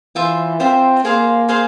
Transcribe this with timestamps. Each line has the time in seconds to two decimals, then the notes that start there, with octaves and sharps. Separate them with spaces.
0.16 E3 F4 C5 E5
0.60 C4 F4 C5 E5
1.04 A#3 G#4 C5 F5 C6
1.49 G#4 C5 F5 C6